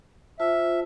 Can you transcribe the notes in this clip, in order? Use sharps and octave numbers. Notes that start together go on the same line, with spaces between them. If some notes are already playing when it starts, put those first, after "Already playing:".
F4 C5 E5 A5